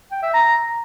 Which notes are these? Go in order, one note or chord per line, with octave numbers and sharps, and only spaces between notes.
G5
E5
A#5